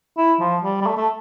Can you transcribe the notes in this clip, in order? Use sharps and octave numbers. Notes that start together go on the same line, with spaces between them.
E4
F3
G3
G3
A3
A3